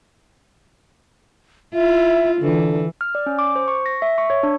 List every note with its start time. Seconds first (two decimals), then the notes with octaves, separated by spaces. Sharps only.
1.74 E4 F4 E5
2.41 D3 E3
3.01 F6
3.15 D5
3.26 C#4
3.39 D6
3.56 C5
3.68 C#6
3.86 A#6
4.02 E5
4.18 C#6
4.30 C#5
4.43 D4